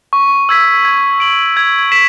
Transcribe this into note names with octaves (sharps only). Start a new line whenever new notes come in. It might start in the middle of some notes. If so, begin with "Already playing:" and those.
C#6
E6 G#6 B6
G#6
D7 F#7
G#6
B6 E7